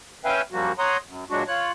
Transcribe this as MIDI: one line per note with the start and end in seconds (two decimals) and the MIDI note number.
0.25 0.42 61
0.25 0.42 71
0.25 0.42 76
0.25 0.42 77
0.25 0.42 79
0.25 0.42 80
0.52 0.72 42
0.52 0.72 53
0.52 0.72 55
0.52 0.72 58
0.52 0.72 66
0.79 0.97 73
0.79 0.97 78
0.79 0.97 82
0.79 0.97 84
0.79 0.97 87
1.07 1.25 42
1.30 1.44 46
1.30 1.44 54
1.30 1.44 56
1.30 1.44 62
1.30 1.44 66
1.48 1.72 65
1.48 1.72 73
1.48 1.72 90